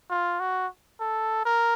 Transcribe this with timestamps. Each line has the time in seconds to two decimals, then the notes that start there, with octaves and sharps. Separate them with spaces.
0.10 F4
0.40 F#4
1.00 A4
1.45 A#4